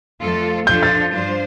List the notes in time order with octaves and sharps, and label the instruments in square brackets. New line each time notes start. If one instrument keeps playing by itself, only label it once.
[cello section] F2 F3 A3 F4 A4
[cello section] F2 F3 D4 F4 A4 [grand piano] G6
[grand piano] A6
[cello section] G2 F3 D4 F4 C5